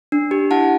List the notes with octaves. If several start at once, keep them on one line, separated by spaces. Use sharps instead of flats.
D4
G4
E4 F#5 A5